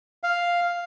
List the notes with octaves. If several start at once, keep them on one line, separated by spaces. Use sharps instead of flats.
F5